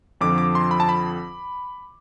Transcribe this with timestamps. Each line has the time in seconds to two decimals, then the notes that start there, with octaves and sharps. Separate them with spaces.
0.21 F2 D3 F3 D6
0.38 D6
0.55 C6
0.71 B5
0.80 A5
0.89 B5